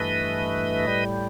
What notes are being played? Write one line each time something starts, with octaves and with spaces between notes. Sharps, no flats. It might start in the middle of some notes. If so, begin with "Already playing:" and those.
Already playing: G2 E3 A3 B4 D#5
A2 G3